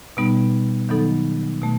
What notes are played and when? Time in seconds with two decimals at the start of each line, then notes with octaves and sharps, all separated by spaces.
0.17 B2 G3 B3 D#4
0.89 D#3 F#3 B3 D#4 A4
1.62 B2 A3